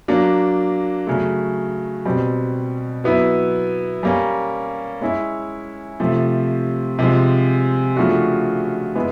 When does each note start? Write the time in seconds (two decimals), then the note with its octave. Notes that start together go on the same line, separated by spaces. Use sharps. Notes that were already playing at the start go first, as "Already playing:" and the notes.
0.08 F#3 A#3 D4
1.07 C#3 F#3 A3
2.05 B2 G3 C4
3.04 F#3 B3 E4
4.03 G3 A#3 C#4
5.01 G#3 C#4 E4
6.00 C3 F3 A3
6.99 C3 F3 G#3
7.97 C#3 F3 A3 D4 F#4
8.95 G#3 B3 E4